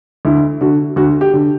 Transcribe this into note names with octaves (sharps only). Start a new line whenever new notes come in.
D2 E4
D3 F#4
D2 F#4
G4
D3